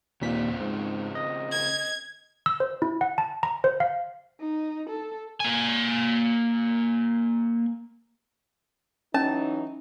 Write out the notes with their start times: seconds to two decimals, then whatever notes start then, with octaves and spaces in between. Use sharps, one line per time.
0.21 D#2 A#2 C#3 C4 F4 B6
0.60 G#2
1.15 D#5
1.51 G#6
2.46 E6
2.60 C5
2.82 E4
3.01 F#5
3.18 A5
3.43 A#5
3.64 C5
3.80 F5
4.41 D#4
4.89 A4
5.40 A#3 G#5
9.14 E3 F#3 C#4 D#4 A5